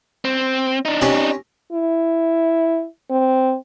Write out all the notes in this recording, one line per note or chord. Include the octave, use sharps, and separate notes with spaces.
C4
D4 D#4
C4 C#4 G4
E4
C4